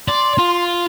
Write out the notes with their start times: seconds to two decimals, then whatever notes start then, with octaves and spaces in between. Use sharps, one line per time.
0.08 D5 C6
0.38 F4